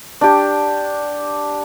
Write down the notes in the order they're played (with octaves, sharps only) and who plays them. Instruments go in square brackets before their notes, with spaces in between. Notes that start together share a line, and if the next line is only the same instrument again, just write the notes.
[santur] D4 G4